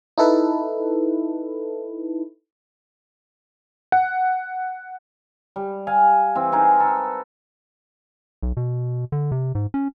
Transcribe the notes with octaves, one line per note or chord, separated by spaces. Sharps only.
D#4 E4 A4 B4
F#5
G3
F5 G#5
E3 C4
D#4 G#4 A#4 C5
A4 B4
B1
B2
D3
C3
G#2
C#4